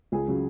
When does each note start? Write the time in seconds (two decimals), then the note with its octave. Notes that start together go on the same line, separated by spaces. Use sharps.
0.12 C#2 G#4
0.28 C#3 F#3